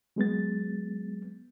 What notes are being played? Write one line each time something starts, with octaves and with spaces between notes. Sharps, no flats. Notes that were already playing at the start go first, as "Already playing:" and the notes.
F#3 G#3 B3 A6